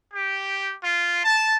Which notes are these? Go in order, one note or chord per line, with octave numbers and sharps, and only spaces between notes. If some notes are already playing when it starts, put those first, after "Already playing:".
G4
F4
A5